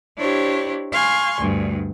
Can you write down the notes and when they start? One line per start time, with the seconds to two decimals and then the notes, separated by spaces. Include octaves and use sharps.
0.18 D4 E4 G4 C5 C#5
0.93 F5 G#5 C6 C#6
1.39 D2 G2